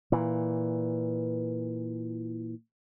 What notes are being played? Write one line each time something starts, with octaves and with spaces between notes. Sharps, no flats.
A#2 E3